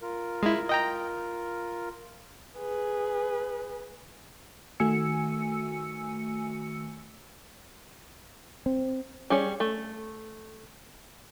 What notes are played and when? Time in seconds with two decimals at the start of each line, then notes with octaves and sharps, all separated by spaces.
0.01 F4 A#4
0.43 G#3 E4
0.69 D#5 G5 A#5
2.60 G#4 B4
4.80 D#3 A3 F#4 G#5 E6 C#7
8.66 C4
9.30 G3 C#4 G#4 C#5
9.60 A3